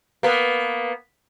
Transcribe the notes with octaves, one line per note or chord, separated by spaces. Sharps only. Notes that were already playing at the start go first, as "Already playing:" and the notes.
A#3 B3